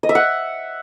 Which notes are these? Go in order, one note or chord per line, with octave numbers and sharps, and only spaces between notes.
D#5
E5
F#5